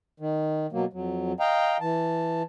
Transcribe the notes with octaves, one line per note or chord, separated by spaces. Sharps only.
D#3
B2 F#3 A#3
F2 F#3
D#5 F5 G5 A#5
E3 A5